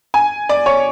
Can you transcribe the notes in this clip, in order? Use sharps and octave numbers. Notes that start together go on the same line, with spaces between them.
G#5
D5
C#5